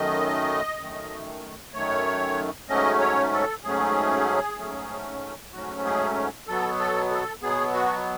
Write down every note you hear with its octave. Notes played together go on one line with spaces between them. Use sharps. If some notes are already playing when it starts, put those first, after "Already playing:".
Already playing: F#2 D#3 A3 D#5
F#2 D#3 A3
F#2 D#3 A3 C#5
G#2 F#3 A3 C#4 D#5
C#5
A4
G#2 F#3 A3 C#4 G#4
G#2 F#3 A3 C#4
G#2 F#3 A3 C#4 F#4
G#4
B2 F#3 B3 A4
A4
A4
B2 F#3 B3 G#4
F#4